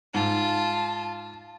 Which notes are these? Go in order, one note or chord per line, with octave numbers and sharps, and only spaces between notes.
G#2 F4 A5